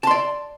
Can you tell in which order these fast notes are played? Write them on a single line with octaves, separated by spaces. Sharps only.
A5 C6 D5